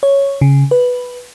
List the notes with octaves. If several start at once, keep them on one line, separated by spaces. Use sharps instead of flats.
C#5
C#3
B4